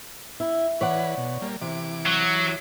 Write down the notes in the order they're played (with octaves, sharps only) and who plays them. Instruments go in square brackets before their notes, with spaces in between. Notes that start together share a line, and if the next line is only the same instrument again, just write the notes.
[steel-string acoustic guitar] E4
[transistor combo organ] E3 B4 [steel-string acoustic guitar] C#5 D5 F#5
[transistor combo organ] B2
G3 A#3
[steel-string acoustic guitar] C3 [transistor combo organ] E3 D6
[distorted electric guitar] F#3